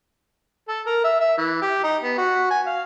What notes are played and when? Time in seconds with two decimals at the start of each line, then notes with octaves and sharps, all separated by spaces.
0.68 A4
0.87 A#4
1.04 E5
1.20 E5
1.38 E3
1.62 G4
1.84 D#4
2.03 B3
2.18 F#4
2.51 G#5
2.67 F5